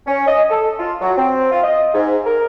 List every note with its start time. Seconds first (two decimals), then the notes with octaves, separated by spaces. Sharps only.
0.07 C#4
0.28 D#5
0.50 A4
0.79 F4
1.01 F#3
1.17 C4
1.52 F4
1.63 D#5
1.94 G#2
2.26 A#4